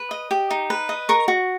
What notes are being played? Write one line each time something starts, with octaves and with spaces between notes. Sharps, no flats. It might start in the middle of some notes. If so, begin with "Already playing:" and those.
Already playing: B4
D#5
G4
D#4
B4
D#5
A#4 C#6
F#4